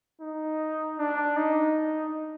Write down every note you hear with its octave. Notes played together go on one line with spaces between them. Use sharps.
D#4
D4
D#4